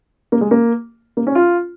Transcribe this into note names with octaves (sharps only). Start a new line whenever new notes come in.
A#3
G#3
A#3
A#3
C#4
F4